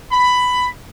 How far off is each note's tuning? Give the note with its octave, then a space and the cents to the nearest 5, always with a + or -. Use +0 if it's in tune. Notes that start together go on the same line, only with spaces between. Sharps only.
B5 +10